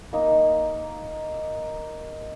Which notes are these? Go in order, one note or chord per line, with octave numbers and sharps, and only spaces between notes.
A#3 D#4